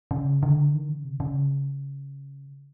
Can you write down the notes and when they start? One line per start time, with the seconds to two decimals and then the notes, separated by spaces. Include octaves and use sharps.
0.11 C#3
0.43 D3
0.74 D#3
0.89 C#3
1.04 C3
1.20 C#3